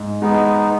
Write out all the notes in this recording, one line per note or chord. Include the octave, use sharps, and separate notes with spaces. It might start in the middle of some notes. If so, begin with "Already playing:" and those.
Already playing: G#2
G#3 B3 D#4